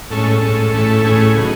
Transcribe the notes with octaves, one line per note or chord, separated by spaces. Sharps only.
A2 G#3 C#4 A4
A2 G#3 C#4
A2 E3 A3 C#4
A2 E3 A3 C#4 G#4
C#3 F#3 B3 D#4